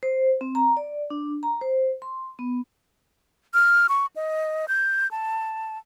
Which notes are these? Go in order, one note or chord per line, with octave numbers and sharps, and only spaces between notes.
C5
C4
A#5
D5
D4
A#5
C5
C6
B3
F6
C#6
D#5
G6
A5